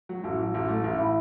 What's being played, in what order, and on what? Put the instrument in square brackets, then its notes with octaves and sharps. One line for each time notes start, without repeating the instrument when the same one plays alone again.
[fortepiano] F#3
A1
F#3
A1
A3
A1
[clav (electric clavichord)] E4